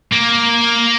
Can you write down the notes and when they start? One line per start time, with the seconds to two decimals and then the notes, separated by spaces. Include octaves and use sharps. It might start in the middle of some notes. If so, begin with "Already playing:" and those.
0.13 A#3